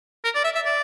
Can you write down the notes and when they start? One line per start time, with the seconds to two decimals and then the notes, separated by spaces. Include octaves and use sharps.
0.24 A#4
0.35 D5
0.44 E5
0.55 E5
0.66 D5